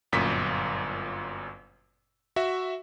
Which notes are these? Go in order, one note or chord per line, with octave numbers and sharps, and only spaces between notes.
G1 F#2 A#2 B6
F#4 E5